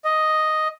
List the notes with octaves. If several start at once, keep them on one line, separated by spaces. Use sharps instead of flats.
D#5